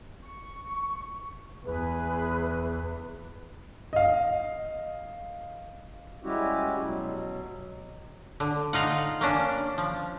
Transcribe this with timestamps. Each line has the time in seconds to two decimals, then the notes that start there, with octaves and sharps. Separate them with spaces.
0.22 C#6
1.65 E2 G#4 B4
3.93 D#5 F5
6.23 G3 G#3 C#4 E4 F#4 G4
6.77 B2 F#3
8.40 D3
8.73 D#4 F4 F#5
9.21 A#3 C#4 D4
9.78 F3